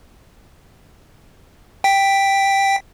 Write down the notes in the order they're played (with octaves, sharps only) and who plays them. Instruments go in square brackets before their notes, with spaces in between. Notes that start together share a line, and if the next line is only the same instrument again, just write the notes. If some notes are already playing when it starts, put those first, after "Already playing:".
[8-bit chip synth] G5 B6